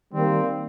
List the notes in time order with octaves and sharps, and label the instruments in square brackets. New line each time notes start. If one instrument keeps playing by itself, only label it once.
[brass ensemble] D#3 G3 A#3 C4